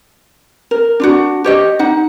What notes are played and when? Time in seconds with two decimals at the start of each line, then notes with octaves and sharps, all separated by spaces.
0.71 A#4
1.00 D4 F4 F#4
1.44 G4 C#5 D#5
1.79 D#4 F#5